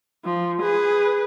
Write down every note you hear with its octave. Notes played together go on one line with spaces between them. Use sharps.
F3
G#4 B4